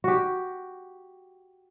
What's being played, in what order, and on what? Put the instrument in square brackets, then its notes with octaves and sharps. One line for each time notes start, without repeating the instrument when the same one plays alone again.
[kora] F#4 G4